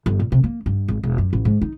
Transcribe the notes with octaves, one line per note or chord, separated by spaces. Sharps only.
G1
A#2
C3
A#3
G2
G#1
E1
F#2
A1
G#2
D#4